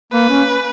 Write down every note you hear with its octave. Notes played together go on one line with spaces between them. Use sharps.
A#3 B4
C#4